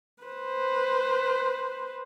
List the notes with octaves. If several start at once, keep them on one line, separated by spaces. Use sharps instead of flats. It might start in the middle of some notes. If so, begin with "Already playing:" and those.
B4 C5